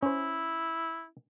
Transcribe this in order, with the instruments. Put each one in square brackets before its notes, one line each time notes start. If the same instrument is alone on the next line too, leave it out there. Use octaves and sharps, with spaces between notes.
[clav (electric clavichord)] C#4 C5 [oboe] E4